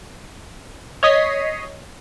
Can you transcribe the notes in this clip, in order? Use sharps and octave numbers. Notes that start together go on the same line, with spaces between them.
C#5 D#5 D#6 G#6 B6 C7